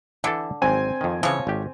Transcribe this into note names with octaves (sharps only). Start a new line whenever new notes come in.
D3 E3 E4 A4
G#1 F#3 C4 G#5
F2 D#3
C#3 E3 F3 C#5
G#1 G4